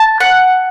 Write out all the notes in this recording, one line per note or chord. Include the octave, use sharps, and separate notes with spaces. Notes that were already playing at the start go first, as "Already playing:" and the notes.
Already playing: A5
F#5